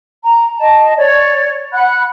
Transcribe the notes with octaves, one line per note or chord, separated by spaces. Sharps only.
A#5
D#5 A5
C#5 D5
F#5 B5 F#6